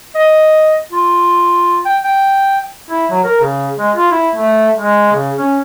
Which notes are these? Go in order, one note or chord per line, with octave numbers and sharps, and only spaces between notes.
D#5
F4
G5
G5
E4
F#3
A#4
C#3
G#3
F4
E4
A3
G#3
C#3
C#4